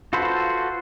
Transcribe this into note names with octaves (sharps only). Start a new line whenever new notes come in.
F4 F#4 A4 B4 C5